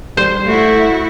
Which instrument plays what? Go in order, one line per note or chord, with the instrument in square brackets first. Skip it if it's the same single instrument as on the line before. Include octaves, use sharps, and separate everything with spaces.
[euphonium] G3 [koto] C5
[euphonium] A3 [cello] E4 F#4